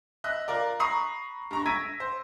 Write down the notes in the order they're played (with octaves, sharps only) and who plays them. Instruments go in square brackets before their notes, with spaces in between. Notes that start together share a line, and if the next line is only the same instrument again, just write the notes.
[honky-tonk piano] D#5 E5 F#6
F4 A#4 D5
A#5 B5 C#6 D#6 C7
G2 A#5 C#6
E6 G#6 A#6 B6 D7 D#7
C5